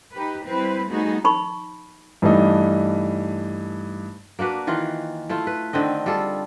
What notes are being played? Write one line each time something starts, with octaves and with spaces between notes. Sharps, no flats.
D#4 G4 B4
G3 C4 E4 B4 C5
G3 A3 B3 D#4 F#4 G#4
D#4 B5 C#6
G2 E3 G3 A3 D#4
A#3 D4 F#4 B4
D#3 E3 F4
A3 E4 F4
B4
D3 D#3 C4 D#5
G3 F4 G#4 A4